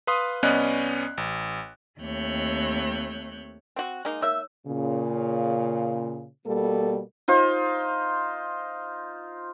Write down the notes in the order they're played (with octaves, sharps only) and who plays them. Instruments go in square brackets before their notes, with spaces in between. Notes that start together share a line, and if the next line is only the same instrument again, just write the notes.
[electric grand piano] B4 F5 C6 D#6
C2 B3 C#4 D5 D#5 F#6
A1
[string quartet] D#2 A3 C4 C#5 F#6 G6
[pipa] C4 F#4
G#3 A#3 D#4
[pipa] A#3 E5 [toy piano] D#4 C#5 E6
[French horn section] A#2 C#3
B2 G3 A#3 A4
[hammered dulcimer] D#4 F4 C5